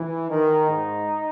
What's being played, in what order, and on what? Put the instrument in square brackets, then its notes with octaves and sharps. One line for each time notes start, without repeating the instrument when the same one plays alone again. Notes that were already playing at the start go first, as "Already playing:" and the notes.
Already playing: [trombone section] E3
[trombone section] D#3 [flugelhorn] D#4
[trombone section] G#2